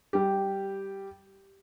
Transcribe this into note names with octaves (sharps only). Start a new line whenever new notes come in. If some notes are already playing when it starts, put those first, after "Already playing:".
G3 G4